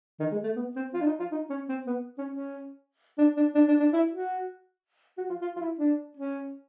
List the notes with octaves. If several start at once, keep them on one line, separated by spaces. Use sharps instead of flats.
D#3
G#3
A3
B3
C4
F4
D4
D#4
F4
D#4
C#4
C4
B3
C#4
C#4
D4
D4
D4
D4
D4
E4
F#4
F#4
F4
F4
F4
E4
D4
C#4